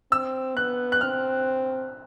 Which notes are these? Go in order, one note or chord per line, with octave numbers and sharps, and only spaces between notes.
C4 E6
B3 F#6
F#6
C4 F6